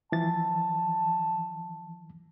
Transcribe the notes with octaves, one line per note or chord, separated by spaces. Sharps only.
E3 F3 A5 A6